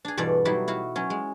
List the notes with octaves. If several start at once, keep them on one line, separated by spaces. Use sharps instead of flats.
D4 G#4
E2 G2 B2 A4 D5
F#3 G3 D#4 E4 F#4 G4
E4 F#4 F5
F#3 C#4
G#3